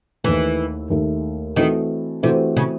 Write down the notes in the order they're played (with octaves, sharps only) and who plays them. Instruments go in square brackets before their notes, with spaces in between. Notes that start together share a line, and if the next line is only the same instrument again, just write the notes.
[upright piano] D#2 D#3 A3 [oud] E3
[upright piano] D#2 D#3 A3
[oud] D#3 [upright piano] E3 A3 C4 F#4 A4
[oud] C3 [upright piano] E3 A3 C4 F#4 A4
[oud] C#3